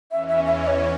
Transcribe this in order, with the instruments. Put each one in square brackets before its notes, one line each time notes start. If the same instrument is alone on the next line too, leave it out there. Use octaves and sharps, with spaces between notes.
[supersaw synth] E2 E3 C#4 [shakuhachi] E5
[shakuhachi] E5
E5
E5
C#5